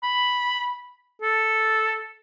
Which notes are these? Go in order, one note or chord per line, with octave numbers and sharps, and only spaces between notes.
B5
A4